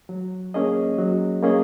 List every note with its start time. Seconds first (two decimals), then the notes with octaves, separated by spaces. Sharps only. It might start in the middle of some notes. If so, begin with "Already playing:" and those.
0.09 F#3
0.54 A#3 C#4 G#4 D#5
0.98 F#3
1.43 A#3 C#4 G#4 D#5